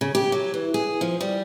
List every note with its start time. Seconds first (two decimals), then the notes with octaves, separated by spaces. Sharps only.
0.01 C#3
0.15 G4
0.32 F#3
0.54 E3
0.74 G#4
1.01 F3
1.21 G3